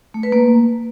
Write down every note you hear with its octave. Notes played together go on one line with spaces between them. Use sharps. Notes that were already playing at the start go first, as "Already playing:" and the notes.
A3
B4
A#3